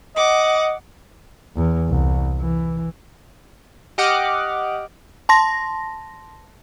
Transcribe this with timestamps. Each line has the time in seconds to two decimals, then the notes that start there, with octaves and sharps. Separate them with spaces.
0.16 D#5 F#5 D6
1.56 E2
1.89 C2
2.40 E3
3.98 G4 D#5 F#5 D6 D#6 F6
5.29 A5 C6 A#6